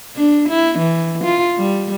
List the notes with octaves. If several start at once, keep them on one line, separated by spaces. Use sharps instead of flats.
D4
E4
E3
F4
G3